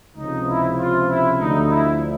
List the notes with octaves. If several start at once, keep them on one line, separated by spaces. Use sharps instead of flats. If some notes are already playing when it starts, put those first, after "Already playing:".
C#2 C3 F3 D#4
E4
F4
E4
D2 D3 F3 D#4
E4